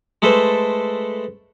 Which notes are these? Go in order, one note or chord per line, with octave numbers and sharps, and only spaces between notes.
G#3 A3 A4 B4 C5